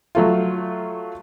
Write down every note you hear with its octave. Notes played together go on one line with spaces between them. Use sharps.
F#3 A3 F4